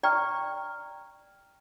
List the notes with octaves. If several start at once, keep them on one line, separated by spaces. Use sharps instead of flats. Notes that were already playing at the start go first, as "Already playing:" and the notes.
D5 G5 A#5 C#6 F6